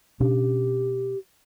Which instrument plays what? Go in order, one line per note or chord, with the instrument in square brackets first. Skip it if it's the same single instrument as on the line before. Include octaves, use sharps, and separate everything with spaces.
[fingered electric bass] B2 C#4 D4 [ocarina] G4